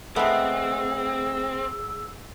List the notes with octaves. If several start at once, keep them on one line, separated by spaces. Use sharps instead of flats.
G#3 A3 B3 C4 G#4 E6